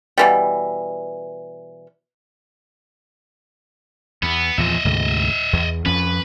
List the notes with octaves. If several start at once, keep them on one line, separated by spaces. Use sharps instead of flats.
B2 E3 G3
E2 B3
E2 A#2 F3 D#5 E5
D2 G#2 C3
E2
F2 F3 C#4 B4